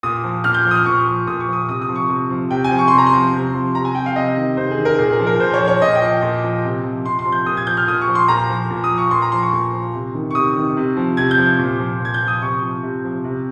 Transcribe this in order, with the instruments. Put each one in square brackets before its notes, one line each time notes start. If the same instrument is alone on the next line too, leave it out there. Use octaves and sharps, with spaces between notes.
[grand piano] A#2 D#6
F3
A#2 F6
G6
F3
D#6
F6
A#2 C#6
F3
A#2 D#6
C#6
F3
D#6
C3 D#6
D#6
F3
C#6
C3
F3
C3 G5
G#5
F3
C#6
C3 C6
A#5
C6
F3
C3
F3
C3 A#5
G#5
F3 G5
F5
C3 D#5
D#3
C3 C5
G#4
D#3
A#4
A#2 G#4
A#4
F3
A#4
A#2 C5
C#5
F3
C#5
A#2 D#5
G5
F3
A#2
F3
C3
F3
C3 C6
C6
F3
G6
A#2 D#6
G#6
F3 G6
F6
A#2 D#6
C#6
F3
C6
A#2 A#5
F3
A#2
D#6
F3
C#6
A#2 C6
A#5
F3 C6
C#6
A#2
F3
C3
D#3
C#6
C3 D#6
D#3
C3
F3
C3 G#6
G6
F3
A#2
F3
A#2 G#6
G6
F3
D#6
C3 C#6
F3
C3
F3
C3